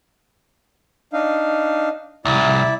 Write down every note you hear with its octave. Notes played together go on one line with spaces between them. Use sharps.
D4 D#4 F5
C2 E4 D5 E5